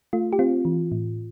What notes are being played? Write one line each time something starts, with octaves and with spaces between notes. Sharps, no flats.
A3 F4
G4
C4 F4
E3
A2